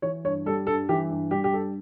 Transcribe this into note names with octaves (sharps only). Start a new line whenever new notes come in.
E3 C#5
G2 C#5
G3 A4
G2 A4
E3 G4
G2
G3 G4
G4
G2 A4